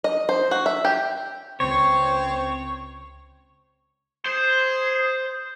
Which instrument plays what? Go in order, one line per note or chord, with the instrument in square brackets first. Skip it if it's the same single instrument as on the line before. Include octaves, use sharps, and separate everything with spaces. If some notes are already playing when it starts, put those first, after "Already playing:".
[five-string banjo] D#5
C5
F#4
E5
G4
[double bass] C#2 [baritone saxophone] C4 [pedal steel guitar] C#5
[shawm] G#4 [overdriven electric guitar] C5